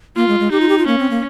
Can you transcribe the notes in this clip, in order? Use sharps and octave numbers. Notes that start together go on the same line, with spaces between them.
A#3 F4
G#3
G#3
D#4 G4
F4
G4
F4
A#3 C#4
C4
A#3